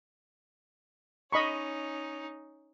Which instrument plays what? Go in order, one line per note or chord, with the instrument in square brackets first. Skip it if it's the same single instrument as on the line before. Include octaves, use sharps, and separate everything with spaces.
[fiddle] C#4 D#4 [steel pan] D#5 B5 C#6